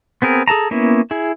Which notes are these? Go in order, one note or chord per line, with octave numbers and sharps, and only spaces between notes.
B3 C4 G#4 A#4
G#4 A4 A5 A#5
A#3 B3 C#4 E4
E4 G#4